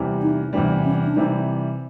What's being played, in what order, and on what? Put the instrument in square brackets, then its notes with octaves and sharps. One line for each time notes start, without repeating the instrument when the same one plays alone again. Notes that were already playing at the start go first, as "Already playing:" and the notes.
Already playing: [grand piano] E2 C3 E3 G3
[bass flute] D#4
[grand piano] E2 C3 E3 G3 [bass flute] D4
[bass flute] C#4
D4
[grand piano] C3 E3 G3 [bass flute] D#4